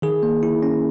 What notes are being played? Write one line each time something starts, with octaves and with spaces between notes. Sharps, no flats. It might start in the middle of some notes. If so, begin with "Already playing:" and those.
D#3 G#4
A#3
E4
C#4